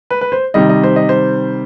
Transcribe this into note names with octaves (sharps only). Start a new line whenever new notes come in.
B4
B4
C5
C3 D#3 G3 D#5
D#5
C5
D#5
C5